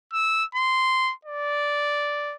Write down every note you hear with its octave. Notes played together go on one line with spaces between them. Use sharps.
E6
C6
D5